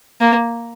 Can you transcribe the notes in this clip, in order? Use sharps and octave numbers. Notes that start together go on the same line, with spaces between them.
A#3